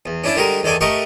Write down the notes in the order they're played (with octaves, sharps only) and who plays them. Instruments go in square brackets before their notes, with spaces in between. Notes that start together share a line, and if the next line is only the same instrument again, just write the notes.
[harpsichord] E2
C#4 D4 E4 D5 A5
D3 G3 G#3 F#4 G4 A#4
E2 D#3 A4 D5 G#5
A3 G4 A#4 D#5 F#5 C#6